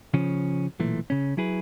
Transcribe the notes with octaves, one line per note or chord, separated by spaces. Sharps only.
C#3 F3 C#4
B1 A#2 E3 A3
C#3 C#4
F#3 E4 G#4 B4